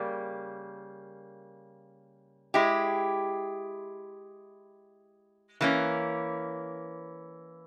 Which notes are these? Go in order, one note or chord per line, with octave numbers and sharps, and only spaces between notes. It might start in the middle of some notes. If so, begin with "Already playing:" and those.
Already playing: C#3 G3 A#3
G#3 E4 G4
E3 A#3 C#4